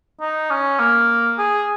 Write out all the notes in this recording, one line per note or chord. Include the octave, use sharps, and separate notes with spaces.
D#4
C#4
A#3
G#4